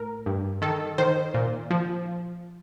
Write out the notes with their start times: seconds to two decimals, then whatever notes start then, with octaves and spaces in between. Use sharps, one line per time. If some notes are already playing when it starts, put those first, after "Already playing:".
Already playing: A2 A#4
0.26 G2
0.62 D#3 A4
0.98 D#3 C5
1.34 A#2
1.71 F3